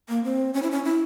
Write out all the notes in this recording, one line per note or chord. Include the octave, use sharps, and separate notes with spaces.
A#3
C4
C#4
E4
C#4
E4